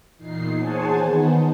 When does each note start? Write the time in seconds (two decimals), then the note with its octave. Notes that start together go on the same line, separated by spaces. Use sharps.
0.17 E2 A#2 D#4 C7
0.57 G#4 C5 C#5 F#5 G#5 A5
0.98 D#3 B3 D#4